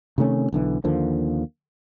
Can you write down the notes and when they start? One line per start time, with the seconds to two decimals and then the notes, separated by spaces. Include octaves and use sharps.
0.18 C3 D#3 A3 C#4
0.53 B1 D3 E3
0.84 D#2 D3 F3 A#3